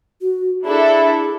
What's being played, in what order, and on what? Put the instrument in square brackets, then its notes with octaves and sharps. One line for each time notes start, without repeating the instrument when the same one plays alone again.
[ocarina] F#4
[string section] D4 E4 A4 [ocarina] G#4